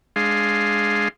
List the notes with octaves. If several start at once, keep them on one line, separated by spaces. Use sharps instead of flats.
G#3 D4 G#4 F5 C6